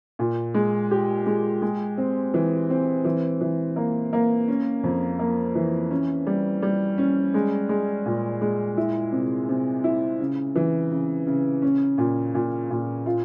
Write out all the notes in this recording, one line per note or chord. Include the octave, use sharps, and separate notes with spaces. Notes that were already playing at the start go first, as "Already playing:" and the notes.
A#2
G#3
G4
G#3
G#3
C4
E3
C4
E3
E3
A#3
A#3
C#4
F2
A#3
E3
C#4
G3
G3
C#4
G#3
G#3
A#2
G#3
E4
C3
C3
E4
C#3
E3
C#3
C#3
C#4
A#2
A#2
A#2
F4